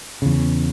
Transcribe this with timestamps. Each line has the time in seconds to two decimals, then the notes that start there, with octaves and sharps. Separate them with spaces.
0.22 E2 C#3